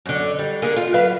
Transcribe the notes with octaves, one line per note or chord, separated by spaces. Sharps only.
F#2 D3
G3
D3 A#3 G#4
F4
F#3 B4 F5